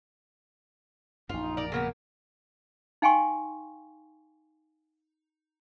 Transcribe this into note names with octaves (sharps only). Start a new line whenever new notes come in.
A#1 F#2 D#4 F4
A#4 D5
C#3 A#3 B3 A#4
D#4 F5 G5 G#5 C6 C#6